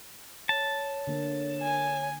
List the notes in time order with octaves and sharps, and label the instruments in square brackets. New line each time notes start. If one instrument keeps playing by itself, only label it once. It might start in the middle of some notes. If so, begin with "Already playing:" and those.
[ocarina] C#5 [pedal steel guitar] A5
[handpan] D3 A#3
[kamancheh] G#5